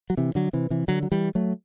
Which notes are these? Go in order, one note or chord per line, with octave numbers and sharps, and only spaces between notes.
F#3
C3 E3
D3 F#3
C3 E3
C3 E3
D3 F#3
F#3
E3 G3
F#3 A3